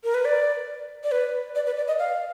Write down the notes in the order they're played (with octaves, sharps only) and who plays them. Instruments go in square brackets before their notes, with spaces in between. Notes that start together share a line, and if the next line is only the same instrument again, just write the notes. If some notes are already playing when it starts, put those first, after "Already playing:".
[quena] A#4
B4
D5
D5
B4
D5
B4
D5
D#5
F5